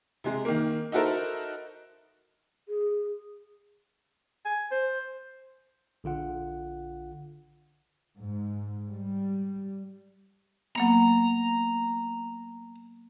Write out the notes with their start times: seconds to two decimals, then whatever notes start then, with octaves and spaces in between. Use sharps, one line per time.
0.24 C3 G#3
0.45 D#3 A#3
0.92 D#4 E4 F#4 A4 A#4 C5
2.69 G#4
4.45 G#5
4.71 C5
6.04 A#1 D3 F4 F#5
8.19 G#2
8.91 G3
10.76 F#3 A#3 B3 A#5